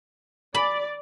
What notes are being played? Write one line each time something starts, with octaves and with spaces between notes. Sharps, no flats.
D5 B5